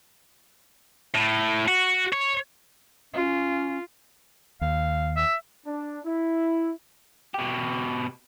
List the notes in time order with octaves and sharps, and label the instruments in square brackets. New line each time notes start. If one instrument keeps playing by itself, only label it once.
[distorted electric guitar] A2
F#4
C#5
[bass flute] C#4 [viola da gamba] F4
[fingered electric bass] D#2 [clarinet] F5
[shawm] E5
[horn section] D4
E4
[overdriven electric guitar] B2 G4